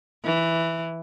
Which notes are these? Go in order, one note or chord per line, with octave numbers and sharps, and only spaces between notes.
E3